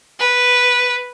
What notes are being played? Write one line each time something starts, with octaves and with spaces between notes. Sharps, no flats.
B4